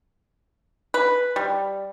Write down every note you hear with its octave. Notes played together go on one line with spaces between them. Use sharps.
B4
G3